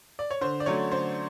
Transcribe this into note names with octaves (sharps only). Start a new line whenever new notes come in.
D5
C#5
D3 C5
D5
F#3 A3 C#4 C#5
D3 C5